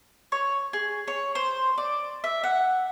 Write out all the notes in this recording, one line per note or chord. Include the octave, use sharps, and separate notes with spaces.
C#5
G#4
C#5
C5
D5
E5
F#5